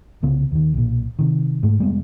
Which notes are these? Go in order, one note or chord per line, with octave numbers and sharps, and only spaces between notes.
C2 C#3 B3
D#2 D#3
B1 A#2
C3 D#3
G#2 A3
F1 G3 G#3 B3